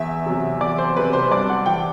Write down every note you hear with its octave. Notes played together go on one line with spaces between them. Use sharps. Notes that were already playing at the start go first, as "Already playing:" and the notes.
Already playing: E2 E5
C3 F#3
E2 D5
C5
C3 F#3 B4
C5
G2 D5
F#5
E3 G5